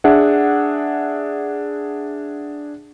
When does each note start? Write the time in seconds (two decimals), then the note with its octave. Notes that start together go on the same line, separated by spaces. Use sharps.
0.04 D4 G#4 E5 F#5